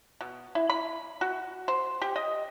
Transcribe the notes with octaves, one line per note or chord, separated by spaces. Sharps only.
B2
E4
B5
F#4
C5
G4
D#5